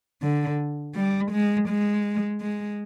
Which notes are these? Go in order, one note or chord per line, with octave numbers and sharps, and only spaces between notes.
D3
G3
G#3
G#3
G#3